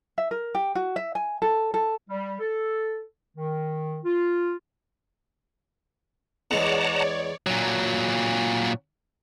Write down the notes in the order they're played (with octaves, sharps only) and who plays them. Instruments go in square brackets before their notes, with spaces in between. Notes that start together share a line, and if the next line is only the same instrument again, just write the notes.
[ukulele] E5
A#4
G4
F#4
E5
G#5
A4
A4
[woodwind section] G3
A4
D#3
F4
[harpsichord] E2 G#3 [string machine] C#5 D5 [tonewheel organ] F#5 A5 A#5
[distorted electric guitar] A#2 F#3